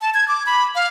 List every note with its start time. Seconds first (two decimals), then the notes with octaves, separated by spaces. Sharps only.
0.02 A5
0.14 G#6
0.28 D6
0.46 B5
0.75 F5